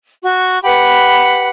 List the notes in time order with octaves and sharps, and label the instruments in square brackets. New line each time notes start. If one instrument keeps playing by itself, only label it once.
[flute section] F#4 C#6
G4 B4 F#5 B5